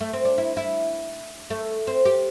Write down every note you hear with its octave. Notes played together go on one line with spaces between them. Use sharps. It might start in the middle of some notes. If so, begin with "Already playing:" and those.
A3
C4
D4
E4
E4
A3
C4
G4